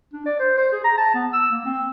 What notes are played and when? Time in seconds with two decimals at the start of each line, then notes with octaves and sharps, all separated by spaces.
0.13 D4
0.25 D5
0.39 C5
0.57 C5
0.72 G#4
0.84 A#5
0.98 A5
1.14 B3
1.33 E6
1.51 A#3
1.65 C4